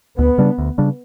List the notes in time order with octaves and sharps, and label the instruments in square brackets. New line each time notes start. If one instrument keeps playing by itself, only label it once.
[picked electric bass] D2 [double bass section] B3
[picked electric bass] C#3 G3 D4
D2
C#3 G3 D4